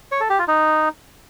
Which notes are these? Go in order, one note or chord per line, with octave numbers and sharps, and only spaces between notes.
C#5
A4
G4
F4
D#4